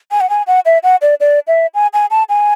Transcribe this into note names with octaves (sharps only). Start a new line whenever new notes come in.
G#5
F#5
G#5
F#5
E5
F#5
D5
D5
E5
G#5
G#5
A5
G#5